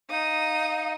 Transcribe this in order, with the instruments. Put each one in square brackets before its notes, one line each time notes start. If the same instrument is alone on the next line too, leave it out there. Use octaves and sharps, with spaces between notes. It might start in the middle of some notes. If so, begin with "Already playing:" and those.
[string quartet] D#4 [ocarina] F5 [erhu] D#6